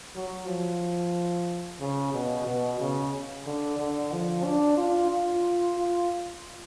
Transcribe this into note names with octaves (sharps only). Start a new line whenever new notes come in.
F#3
F3
C#3
B2
B2
C#3
D3
D3
F3
D4
F4
F4
F4